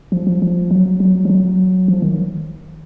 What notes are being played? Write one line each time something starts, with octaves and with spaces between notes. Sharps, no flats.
F3
F3
F3
F#3
F#3
F3
F#3
F3
D#3